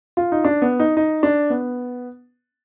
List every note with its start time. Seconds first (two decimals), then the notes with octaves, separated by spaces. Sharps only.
0.17 F4
0.32 D#4
0.45 D4
0.62 B3
0.79 D#4
0.97 D#4
1.23 D4
1.50 B3